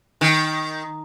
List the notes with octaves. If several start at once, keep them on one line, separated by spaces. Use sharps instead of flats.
D#3